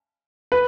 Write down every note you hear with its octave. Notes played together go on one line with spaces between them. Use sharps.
B4